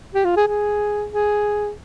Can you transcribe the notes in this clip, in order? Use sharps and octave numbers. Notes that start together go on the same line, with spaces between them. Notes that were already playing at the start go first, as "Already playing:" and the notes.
G4
F4
G#4
G#4
G#4